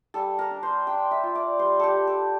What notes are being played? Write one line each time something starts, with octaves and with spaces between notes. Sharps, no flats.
G3 A4
A#4
D4
C5
D4 G5
E5
F4
D5
G3 C5
G4 A4
G3
A4